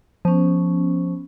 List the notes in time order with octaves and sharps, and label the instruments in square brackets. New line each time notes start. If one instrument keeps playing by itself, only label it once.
[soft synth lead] F3 [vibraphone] B3 C#4